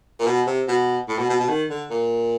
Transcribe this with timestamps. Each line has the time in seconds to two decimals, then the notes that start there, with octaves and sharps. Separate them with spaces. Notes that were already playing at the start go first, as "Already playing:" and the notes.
0.20 A#2
0.27 B2
0.47 C3
0.68 B2
1.08 A2
1.18 B2
1.29 B2
1.40 B2
1.49 D#3
1.70 D3
1.90 A#2